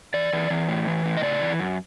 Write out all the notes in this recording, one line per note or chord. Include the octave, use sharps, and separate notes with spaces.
E3 D5
E3
E3
A2
E3
A2
D#5
C#3 D5
E3
F#2